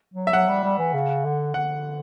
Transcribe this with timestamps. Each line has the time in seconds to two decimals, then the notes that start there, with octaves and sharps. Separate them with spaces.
0.13 F#3
0.27 E5
0.33 F#3 F#5
0.48 G3
0.64 G3
0.78 E3
0.93 C#3
1.24 D3
1.54 D3 F#5